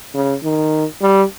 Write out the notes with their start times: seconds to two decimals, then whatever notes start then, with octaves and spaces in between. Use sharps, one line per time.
0.14 C#3
0.44 D#3
1.02 G3